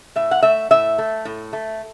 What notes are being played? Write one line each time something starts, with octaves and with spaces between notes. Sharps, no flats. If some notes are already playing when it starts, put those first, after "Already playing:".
A2 E5
F#5
A3 E5
A2 E5
A3
A2
A3